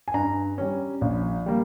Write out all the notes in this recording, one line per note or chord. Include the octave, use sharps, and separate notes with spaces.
G#5
G2 A#5
G3 C#4
A#1
G3 A#3